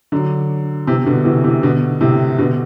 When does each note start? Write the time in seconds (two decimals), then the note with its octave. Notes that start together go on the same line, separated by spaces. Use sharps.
0.12 D3 F#3
0.87 C3 E3
1.06 B2 D3
1.25 C3 E3
1.44 C3 E3
1.63 B2 D3
2.01 A2 C3
2.38 B2 D3